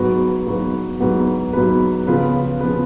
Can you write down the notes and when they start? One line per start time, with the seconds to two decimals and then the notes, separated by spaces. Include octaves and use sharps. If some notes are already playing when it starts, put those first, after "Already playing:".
Already playing: G#2 F#3 B3 F#4 B4
0.46 G#2 F#3 B3 F#4 B4
1.00 G#2 F#3 B3 F#4 B4
1.53 G#2 F#3 B3 F#4 B4
2.07 C#3 F3 B3 F4 B4
2.61 C#3 F3 B3 F4 B4